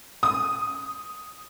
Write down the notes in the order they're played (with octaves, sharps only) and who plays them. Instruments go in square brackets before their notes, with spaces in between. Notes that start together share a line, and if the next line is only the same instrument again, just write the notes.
[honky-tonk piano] D#6